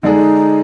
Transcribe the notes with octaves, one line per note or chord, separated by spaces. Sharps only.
D3 G#3 D4 D#4 G#4